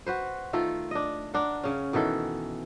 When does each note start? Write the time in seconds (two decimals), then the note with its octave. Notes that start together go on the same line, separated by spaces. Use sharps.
0.06 F#4 B4 C5
0.53 D#3 A3 F4 A4
0.91 D4 D#5
1.34 D4 A#4 F#5
1.63 C#3 C#4
1.93 B2 D#3 E3 A4